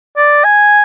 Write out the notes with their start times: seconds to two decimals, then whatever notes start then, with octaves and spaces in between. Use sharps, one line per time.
0.17 D5
0.44 G#5